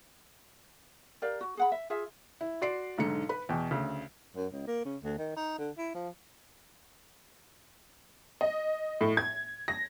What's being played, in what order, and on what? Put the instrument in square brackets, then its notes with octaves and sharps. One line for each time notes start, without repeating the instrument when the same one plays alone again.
[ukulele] G4 A#4 D5 F5
F#4
G#4 F#5 B5
E5
F4 G#4 E5
[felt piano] E4
F#4 D5 C6 C7 D7
B1 G#2 D3 C#7
B4 B5
E2 B2 G5
D2 C#3
[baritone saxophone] F#2
C#2
A#3
C#3
D2
D#3
D#4
D3
E4
F3
[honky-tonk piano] D#5
A2
G#6
A#6